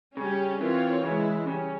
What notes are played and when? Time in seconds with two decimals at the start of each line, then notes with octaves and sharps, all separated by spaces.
0.17 C#3 G3 C#4 G4
0.61 E3 C4 F4 A#4 C#5
1.04 C#3 E3 G#3 E4
1.47 C#3 G3 C#4